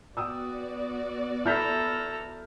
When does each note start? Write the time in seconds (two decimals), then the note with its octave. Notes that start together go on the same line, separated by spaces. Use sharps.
0.17 B3 F#4 D5 G5 D#6 E6
1.46 E4 A4 A#5 F6 G6 B6